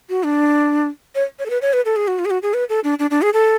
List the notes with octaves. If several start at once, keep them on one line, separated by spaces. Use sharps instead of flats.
F#4
D4
C#5
C#5
A4
B4
C#5
B4
A4
G#4
F#4
F4
G#4
F#4
G#4
B4
A4
D4
D4
D4
G#4
A4